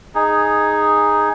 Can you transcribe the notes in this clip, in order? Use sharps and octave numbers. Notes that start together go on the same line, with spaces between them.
D#4 G#4